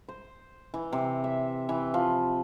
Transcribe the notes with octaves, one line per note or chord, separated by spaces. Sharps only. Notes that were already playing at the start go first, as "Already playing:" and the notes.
C5
E3
C3
E5
E3
F3